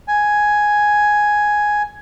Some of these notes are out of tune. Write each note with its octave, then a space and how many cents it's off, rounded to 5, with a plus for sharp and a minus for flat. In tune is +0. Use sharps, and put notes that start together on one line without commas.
G#5 +5